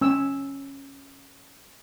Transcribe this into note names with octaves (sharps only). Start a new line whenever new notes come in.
C#4 E6